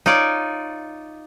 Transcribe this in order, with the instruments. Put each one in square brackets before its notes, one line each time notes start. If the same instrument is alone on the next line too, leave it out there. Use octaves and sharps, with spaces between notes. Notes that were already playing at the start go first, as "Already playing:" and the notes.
[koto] D#4 F4 C#5 D5